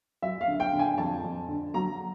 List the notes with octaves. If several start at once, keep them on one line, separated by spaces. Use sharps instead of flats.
F#3 E5
F5
D3
G5
D3
G#5
F2 A5
F2
D3
F#3 A#5